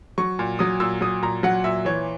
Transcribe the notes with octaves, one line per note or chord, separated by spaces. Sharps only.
F#3 C#6
A#2
F#3 D#6
A#2 E6
F#3 D#6
A#2 A#5
F#3 F#5
A#2 E5
E3 C#5